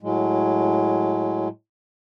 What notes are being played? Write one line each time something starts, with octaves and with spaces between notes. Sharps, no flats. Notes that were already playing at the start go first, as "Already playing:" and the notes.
A2 F#3 G#3